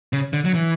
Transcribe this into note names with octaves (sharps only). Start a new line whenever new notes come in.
C#3
D3
F#3
E3